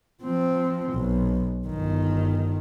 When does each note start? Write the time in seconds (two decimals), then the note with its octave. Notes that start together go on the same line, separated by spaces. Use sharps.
0.23 F3 C4
0.93 B1
1.67 G1 D#3